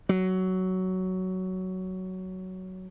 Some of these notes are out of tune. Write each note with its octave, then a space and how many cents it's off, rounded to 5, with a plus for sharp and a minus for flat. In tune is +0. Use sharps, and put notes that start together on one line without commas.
F#3 +10